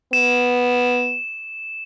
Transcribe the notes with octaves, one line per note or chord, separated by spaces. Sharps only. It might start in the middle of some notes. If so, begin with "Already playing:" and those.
B3 E7